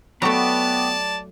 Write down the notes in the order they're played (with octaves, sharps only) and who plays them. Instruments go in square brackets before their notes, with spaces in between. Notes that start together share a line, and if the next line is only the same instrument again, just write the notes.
[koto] F#3 A3 [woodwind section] B3 [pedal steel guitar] F#4 G4 B4 [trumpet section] D5 A5